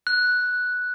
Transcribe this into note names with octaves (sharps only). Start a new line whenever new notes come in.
F#6